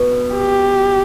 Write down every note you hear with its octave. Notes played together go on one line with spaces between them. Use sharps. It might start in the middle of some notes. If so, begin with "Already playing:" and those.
Already playing: B2
G4